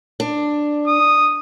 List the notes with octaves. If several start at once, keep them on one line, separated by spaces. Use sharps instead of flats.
D4
D#6